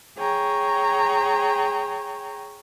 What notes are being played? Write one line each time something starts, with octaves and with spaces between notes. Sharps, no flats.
G#4 C#5 G5 A#5